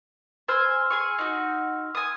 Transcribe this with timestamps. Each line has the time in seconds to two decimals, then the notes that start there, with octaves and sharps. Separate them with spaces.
0.48 C5 G#5 C6 E6 F6
0.90 G#4 G#5 C#6
1.19 D#4 F#4
1.95 G#5 D#6